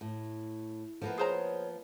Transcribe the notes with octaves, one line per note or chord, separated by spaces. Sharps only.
A2
F3 A#3 B3 A4
G#4 C5 C#5 A#5